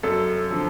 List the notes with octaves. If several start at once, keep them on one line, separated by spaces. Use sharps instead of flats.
F#2 A4
D3 F3